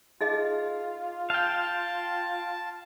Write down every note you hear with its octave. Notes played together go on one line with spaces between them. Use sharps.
D#4 F4 G#4 D#5
F5 G5 A5